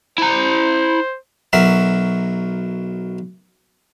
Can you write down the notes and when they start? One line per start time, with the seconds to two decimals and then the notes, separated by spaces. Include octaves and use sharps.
0.18 E4 C5 A#5
1.53 B1 F#3 F#4 A#4 E5